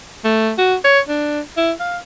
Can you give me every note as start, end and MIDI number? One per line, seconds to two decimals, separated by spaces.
0.24 0.53 57
0.58 0.75 66
0.84 0.99 73
1.09 1.41 62
1.57 1.72 64
1.80 1.97 77